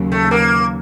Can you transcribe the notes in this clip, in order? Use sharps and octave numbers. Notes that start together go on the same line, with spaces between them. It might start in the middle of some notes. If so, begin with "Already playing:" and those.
Already playing: D#2 C#3 F#3
A3
A#3